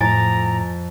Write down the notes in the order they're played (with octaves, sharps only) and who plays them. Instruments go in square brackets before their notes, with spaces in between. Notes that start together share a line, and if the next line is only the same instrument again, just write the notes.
[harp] F2 [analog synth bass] A2 [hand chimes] G#5 A6 [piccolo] A#5